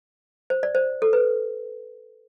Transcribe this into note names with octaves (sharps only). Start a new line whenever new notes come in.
C5
D5
C5
A4
B4